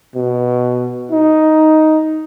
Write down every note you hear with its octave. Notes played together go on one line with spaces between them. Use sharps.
B2
D#4